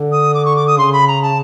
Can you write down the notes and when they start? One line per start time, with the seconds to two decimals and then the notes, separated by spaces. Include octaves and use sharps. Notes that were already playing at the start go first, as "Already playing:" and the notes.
Already playing: D3
0.12 D#6
0.34 D6
0.45 C#6
0.56 D6
0.67 D#6
0.78 C#3 C6
0.92 B5
1.07 A#5
1.22 A5